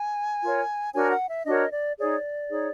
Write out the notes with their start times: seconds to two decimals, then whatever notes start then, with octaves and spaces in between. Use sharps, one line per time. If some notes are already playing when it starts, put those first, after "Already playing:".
Already playing: G#5
0.42 F4 A#4 C#5
0.94 D4 F#4 A#4 C#5 G#5
1.11 F#5
1.29 E5
1.46 D4 F#4 A#4 C#5 D#5
1.72 D5
1.98 D#4 G#4 C#5 D5
2.49 D#4 G#4 C#5